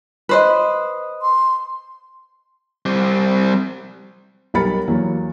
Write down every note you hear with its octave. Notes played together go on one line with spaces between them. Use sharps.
B4 C5 D#5
C6
G3 C4
B1 G3 A#4 B5 A6 C#7
E2 F#3 A#3